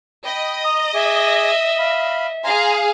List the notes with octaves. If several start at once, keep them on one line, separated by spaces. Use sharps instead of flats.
D#5 G5 B5
A#5 D#6
G#4 E5 D6
F5 B5
G#4 F5 G#5 A#5 C6